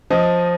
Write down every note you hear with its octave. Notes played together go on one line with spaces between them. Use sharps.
F3 D#5